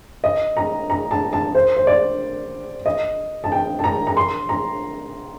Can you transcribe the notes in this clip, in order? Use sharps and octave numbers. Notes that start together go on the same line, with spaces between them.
D#5
A#5
A#5
A5
A5
C5
C5
D5
D#5
A5
G5
A5
A#5
A#5
C6
A#5